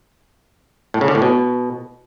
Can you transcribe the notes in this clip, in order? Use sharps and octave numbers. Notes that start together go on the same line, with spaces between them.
A2
C#3
D3
A2
B2